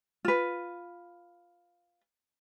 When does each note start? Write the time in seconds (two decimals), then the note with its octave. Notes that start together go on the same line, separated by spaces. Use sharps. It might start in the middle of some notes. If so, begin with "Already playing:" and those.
0.25 F4 B4